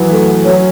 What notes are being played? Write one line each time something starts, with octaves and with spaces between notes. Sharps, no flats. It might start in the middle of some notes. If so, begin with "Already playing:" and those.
Already playing: E3 F#3 B3
A3
F#3 C#4